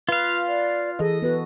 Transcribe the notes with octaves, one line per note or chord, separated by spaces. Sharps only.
F4 B4 F5
D5
E3 G#4 A4 D#5
B3 F#4 B4